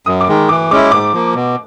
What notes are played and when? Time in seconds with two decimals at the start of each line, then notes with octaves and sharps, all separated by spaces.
0.06 F#2 D#6
0.21 D6
0.28 D#3 G#3
0.49 E3 D6
0.71 G#3 C#4 E4 D6
0.91 G#2 D6
1.13 F3 A#3
1.35 B2